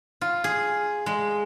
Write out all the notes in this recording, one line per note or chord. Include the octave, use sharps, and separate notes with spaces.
F4
G#4
G#3